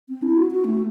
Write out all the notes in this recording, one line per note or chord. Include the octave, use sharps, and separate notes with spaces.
C4
E4
F#4
F#4
A3